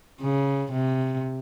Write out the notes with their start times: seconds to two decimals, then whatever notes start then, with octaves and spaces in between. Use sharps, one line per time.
0.21 C#3
0.72 C3